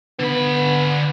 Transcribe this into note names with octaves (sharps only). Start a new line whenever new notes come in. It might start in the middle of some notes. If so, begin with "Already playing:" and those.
D3 B3 B5